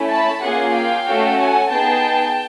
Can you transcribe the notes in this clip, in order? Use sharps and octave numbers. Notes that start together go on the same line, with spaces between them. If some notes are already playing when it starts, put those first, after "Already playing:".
Already playing: A3 C#4 E4
A5 B5
A#3 C#4 F4 G#4 F#5 G#5
F5 G5
A3 C#4 F#4 A4
F#5 G#5
B3 D#4 G#4 G5 A5